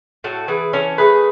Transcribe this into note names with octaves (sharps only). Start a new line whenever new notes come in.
A2 F#4 A4
E3 G#4 B4
C#4 A4 C#5
A3 G#4 B4